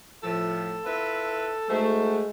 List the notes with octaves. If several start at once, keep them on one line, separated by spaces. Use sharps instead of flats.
A2 F3 A4
E4 F4 B4
G#3 A3 D#4 F#4 C5